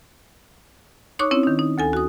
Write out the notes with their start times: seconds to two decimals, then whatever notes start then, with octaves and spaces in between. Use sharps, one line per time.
1.19 D#4 C#5 C#6 D6 F#6
1.31 C4 C#4 E4 C#5
1.43 D#3 D#4
1.59 D#4
1.78 D2 A4 G#5
1.93 F#4 D#6